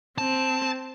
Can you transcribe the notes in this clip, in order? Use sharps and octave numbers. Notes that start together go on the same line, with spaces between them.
C4 A5